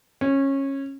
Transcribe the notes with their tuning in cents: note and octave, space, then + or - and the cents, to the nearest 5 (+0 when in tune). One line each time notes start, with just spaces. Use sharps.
C#4 -20